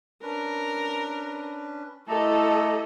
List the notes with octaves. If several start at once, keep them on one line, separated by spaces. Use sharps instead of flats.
C#4 D4 A#4 B4
A3 E4 G4 A4 D#5 A#5